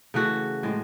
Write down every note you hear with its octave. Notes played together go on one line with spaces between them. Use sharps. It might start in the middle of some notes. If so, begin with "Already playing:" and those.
C#3 E3 A3 F#4
A2 G#3 C4